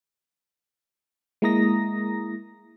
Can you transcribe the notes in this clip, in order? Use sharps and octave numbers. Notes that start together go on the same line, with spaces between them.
G#3 A#3 E4 A#5 D#6 A#6